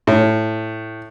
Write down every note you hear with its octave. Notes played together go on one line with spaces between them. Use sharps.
A2